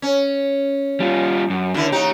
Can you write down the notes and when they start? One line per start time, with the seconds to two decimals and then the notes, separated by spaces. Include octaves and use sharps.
0.02 C#4
1.00 G3 F4
1.50 F#2
1.74 D#2 D3 E4
1.92 D#4 G4 C#5